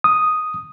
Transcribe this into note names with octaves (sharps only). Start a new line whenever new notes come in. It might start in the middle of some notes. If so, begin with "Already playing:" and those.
D#6